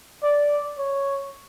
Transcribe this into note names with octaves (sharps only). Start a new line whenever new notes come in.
D5
C#5